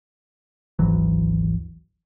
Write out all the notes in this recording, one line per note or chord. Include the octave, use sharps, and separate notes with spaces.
G#1 D2 E3 F#3